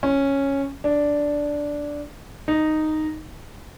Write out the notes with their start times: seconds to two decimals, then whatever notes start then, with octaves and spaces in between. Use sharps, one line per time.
0.03 C#4
0.84 D4
2.48 D#4